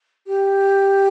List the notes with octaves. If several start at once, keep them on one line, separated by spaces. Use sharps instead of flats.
G4